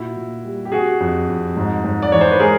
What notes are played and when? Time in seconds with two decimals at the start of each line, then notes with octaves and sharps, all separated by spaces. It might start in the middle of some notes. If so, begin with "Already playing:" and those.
Already playing: A#2 E4 F#4
0.17 A#2
0.45 G3
0.65 G4
0.72 C3 F#4 G#4
1.00 F2
1.28 F2
1.57 G#2
1.84 G#2
2.02 D5
2.12 E3 C#5
2.21 C5
2.31 B4
2.40 G#3 G#4 A#4